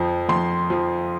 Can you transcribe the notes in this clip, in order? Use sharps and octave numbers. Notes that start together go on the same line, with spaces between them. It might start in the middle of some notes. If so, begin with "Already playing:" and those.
Already playing: F2 F3
F2 C6
F3